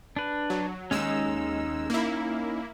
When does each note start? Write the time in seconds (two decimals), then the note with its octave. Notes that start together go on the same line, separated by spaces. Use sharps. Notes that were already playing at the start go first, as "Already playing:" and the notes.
0.16 D4 B4
0.50 F#3
0.91 D#2 G#3 C#4 D#4 E6
1.90 A#3 E4